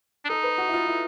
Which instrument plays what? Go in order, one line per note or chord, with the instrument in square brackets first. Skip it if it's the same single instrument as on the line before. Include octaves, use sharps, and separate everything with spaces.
[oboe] D4
[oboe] D#4 [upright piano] A4
[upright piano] B4
F#4
E4
F4
E4